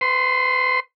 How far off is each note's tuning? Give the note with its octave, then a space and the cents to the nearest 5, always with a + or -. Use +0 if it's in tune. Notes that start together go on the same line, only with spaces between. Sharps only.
B4 +40 C6 +0